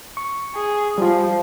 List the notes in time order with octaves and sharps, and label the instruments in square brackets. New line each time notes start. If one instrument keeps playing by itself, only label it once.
[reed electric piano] C#6
[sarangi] G#4
[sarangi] F3 [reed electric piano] G3 F4